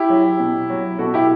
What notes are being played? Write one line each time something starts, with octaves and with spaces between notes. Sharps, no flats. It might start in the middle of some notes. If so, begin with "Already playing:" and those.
Already playing: E4 G4
F#3
B2
F#3
B2 F#4 A4
E4 G4